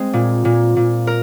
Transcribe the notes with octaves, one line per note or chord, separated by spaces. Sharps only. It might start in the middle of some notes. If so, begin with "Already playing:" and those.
Already playing: G#3 C4 C5
A#2
A#2
A#2
A#4